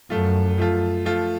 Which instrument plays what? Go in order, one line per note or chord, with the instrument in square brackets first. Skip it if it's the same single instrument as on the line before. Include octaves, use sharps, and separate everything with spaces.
[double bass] F#2 [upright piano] F3 A3 F4
[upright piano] F3 A3 F4
F3 A3 F4